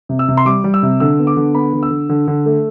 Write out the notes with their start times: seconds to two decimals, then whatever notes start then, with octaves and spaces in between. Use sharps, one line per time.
0.09 C3
0.19 E6
0.28 C3
0.37 C6
0.45 G3 D6
0.64 G3
0.74 E6
0.83 C3
1.00 D3 E6
1.19 B3
1.27 D6
1.37 D3
1.54 B3 B5
1.73 D3
1.83 E6
1.91 D3
2.09 D3
2.28 D3
2.46 A3